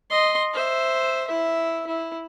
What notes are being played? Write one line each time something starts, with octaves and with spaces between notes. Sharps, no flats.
D#5 C6
C5 E5
E4 E5
E4